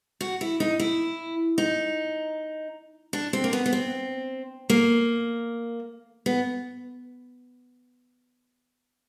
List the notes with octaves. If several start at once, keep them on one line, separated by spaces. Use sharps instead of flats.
F#4
E4
D#4
E4
D#4
D4
C4
A#3
B3
B3
C4
A#3
B3